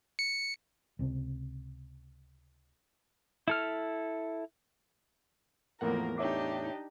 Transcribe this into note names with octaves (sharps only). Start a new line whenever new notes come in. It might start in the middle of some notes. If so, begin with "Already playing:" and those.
C#7
C#2 C3
E4 A4 F6
E2 A2 F3 A#3 A#4 F#5
D4 D#4 G4 C#5 E5 D6